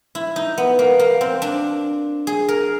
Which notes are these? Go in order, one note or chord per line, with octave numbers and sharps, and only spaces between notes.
E4
D#4
B3
A#3
A#3
C4
D4
G#4
A#4